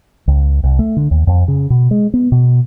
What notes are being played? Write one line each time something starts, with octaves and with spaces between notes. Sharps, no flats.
C#2
C2
A3
D3
D#2
F2
C#3
B2
G#3
B3
B2